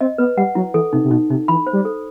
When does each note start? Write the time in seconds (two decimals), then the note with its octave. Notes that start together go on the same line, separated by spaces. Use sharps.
0.01 C4 D#5
0.18 B3 B4
0.37 G3 F#5
0.55 F#3 E4
0.74 E3 A4
0.93 C3 D#4
1.04 C3
1.11 B2 D#4
1.30 C3 D#4
1.48 E3 B5
1.67 C5
1.73 G3
1.85 A4